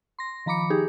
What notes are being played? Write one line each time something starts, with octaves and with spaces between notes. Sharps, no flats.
C6 A#6
D#3 F3 A#5 B5 D6 C#7
D#4 G4 G#4